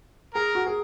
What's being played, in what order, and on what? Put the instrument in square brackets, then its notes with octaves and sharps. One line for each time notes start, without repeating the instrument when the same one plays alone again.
[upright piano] G#4 [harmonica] A#4
[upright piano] F#4
G#4